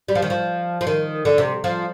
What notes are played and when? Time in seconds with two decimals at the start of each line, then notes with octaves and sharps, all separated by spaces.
0.08 G3
0.15 F3
0.22 D#3
0.30 F3
0.81 F3
0.87 D#3
1.25 D3
1.38 C3
1.64 F3